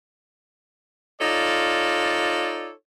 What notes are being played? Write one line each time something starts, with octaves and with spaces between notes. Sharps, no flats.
D#4 F4 A4 C#5 D5